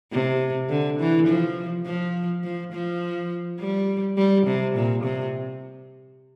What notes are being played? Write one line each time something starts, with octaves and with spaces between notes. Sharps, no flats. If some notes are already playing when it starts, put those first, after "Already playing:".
C3
D3
E3
F3
F3
F3
F3
G3
G3
C3
A#2
C3